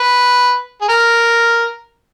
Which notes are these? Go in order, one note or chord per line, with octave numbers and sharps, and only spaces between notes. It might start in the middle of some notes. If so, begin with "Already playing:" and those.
Already playing: B4
G#4
A#4